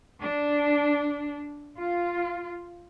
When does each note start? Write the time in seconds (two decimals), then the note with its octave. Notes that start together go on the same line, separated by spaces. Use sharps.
0.21 D4
1.77 F4